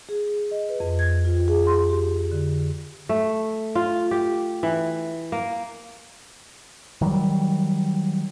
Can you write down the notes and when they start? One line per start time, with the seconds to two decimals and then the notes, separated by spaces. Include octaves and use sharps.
0.09 G#4
0.51 D#5
0.69 B4
0.80 F2
0.99 G#6
1.25 F4
1.48 G#4
1.67 C6
1.90 G4
2.32 D3
3.09 A3
3.75 F4
4.11 G4
4.63 E3
5.32 A#3
7.01 D#3 F#3 G3